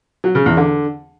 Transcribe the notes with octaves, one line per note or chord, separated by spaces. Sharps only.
F#3
C#3
E2
D3